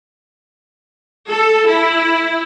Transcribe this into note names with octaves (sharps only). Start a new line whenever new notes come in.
A4
E4